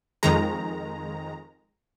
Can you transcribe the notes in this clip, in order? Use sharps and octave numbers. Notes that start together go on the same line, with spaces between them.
F2 D#3 G#3 A#5